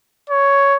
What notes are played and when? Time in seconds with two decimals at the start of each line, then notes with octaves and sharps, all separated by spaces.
0.30 C#5